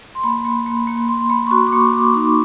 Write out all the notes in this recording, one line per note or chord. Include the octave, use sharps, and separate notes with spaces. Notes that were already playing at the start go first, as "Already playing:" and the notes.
C6
A#3 B5
A#3
A#3
A#3
A#3 C6
A#3 B5
C#6
F#4 C6
D6
A#3 C#6
A#3 D6
D#4